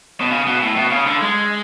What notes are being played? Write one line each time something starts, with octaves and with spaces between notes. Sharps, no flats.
B2
C#3
B2
A2
B2
C#3
D3
G#3